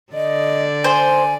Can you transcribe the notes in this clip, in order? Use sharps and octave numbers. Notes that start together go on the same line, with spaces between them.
D3 D5 D#5
C5 G#5